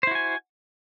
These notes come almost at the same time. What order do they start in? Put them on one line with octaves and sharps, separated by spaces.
C5 E4 F#4 G#5